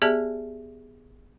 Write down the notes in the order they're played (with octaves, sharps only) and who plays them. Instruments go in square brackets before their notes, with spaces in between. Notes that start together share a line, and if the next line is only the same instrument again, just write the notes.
[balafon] B3 G4 G#4 D5 E5 A5